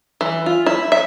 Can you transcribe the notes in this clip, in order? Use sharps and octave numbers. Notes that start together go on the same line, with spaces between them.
E3
F4
E4
E5